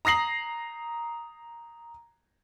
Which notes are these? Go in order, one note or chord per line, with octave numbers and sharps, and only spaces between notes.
A#5 D#6 A#6 C7 F#7